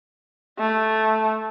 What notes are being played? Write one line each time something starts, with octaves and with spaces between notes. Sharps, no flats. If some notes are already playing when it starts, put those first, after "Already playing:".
A3